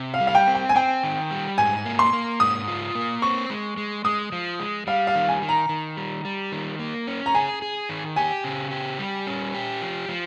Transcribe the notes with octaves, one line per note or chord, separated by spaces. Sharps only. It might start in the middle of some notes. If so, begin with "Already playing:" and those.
Already playing: C3
F5
G3
F5
G5
C4
G5
G#5
C4 G5
D#3
G3
G#2 G#5
A#3
C6
A#3
G#2 D#6
F4
A#3
C4 C#6
G#3
G#3
G#3 D#6
F3
G#3
G3 F5
F5
D#3
G#5
D#3
A#5
D#3
G3
G3
D#3
A#3
C#4
A#5
G#4 G#5
G#4
D#3
G4 G#5
C#3
G4
G3
C#4
G4
F3
F3